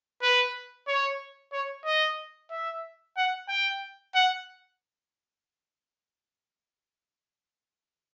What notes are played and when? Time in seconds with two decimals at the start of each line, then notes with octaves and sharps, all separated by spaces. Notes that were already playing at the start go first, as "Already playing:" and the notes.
0.22 B4
0.87 C#5
1.53 C#5
1.86 D#5
2.50 E5
3.17 F#5
3.49 G5
4.15 F#5